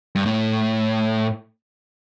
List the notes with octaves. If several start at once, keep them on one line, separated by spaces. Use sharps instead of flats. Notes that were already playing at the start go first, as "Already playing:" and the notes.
G2
A2